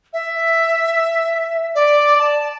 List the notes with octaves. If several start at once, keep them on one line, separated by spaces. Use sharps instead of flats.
E5
D5
A5